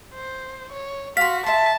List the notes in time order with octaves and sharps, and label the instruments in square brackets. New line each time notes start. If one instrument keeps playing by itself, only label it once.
[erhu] C5
C#5
[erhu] F#4 [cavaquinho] F5 C6 [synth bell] B6
[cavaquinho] E5 A#5 C6 [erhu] A5